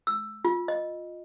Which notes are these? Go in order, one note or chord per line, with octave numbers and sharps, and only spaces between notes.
E6
F4
D#5